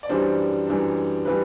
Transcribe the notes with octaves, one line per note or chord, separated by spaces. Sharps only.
D5
F#2 E3 G3 D4 C5
F#2 E3 G3 D4
E3 G3 B4